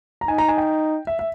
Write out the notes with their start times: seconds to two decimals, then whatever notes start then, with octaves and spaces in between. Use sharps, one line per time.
0.21 A#5
0.28 D#4 G#5
0.38 A#5
0.48 G#5
0.58 G5
1.07 E5
1.19 E5